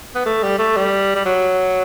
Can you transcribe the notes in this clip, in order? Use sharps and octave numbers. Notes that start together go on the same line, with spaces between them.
B3
A3
G3
A3
G3
G3
F#3